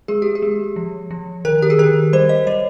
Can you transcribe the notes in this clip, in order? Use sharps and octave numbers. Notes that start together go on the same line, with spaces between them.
G#3 G#4
G4
G#4
G#3
F3
F3
D#3 A#4
G4
G#4
D#3 A#4
G3 C5
D#5
G3 C#5